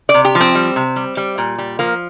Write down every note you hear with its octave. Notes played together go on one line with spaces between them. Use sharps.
D5
C3
G4
F3
C4
G3
C3
G3
G3
A#2
G3
F3 A#3